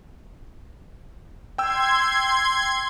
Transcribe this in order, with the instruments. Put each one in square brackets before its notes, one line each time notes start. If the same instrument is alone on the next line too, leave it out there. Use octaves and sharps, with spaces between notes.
[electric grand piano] G5 E6 [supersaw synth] C6 G#6